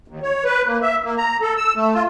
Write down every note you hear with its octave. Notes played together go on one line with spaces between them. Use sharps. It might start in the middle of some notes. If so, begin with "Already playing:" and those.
D#2
C#5
B4
A#3
E5
A#3
A#5
A4
E6
A3
F4